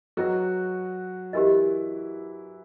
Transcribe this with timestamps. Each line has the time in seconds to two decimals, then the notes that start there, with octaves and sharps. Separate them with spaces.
0.17 F#3 F#4 G#4 B4 D#5 G5 A#5
1.33 E3 E4 G4 A#4 D#5